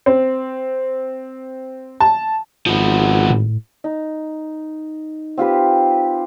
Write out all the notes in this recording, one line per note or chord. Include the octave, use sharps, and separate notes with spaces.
C4
A5
G#1 F3 B3
A2
D#4
C4 F4 G4 B4